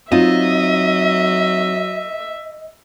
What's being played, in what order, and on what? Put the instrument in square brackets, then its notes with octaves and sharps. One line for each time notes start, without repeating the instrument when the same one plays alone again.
[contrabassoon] F#3 [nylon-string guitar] C4 D#4 F4 [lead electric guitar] D#5 [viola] E5